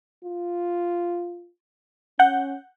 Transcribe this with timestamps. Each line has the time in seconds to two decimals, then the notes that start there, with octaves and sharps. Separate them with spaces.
0.25 F4
2.19 C#4 F#5 G6